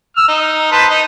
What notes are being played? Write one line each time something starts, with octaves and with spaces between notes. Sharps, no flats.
E6 F6
D#4
B4 C5 A5
D#4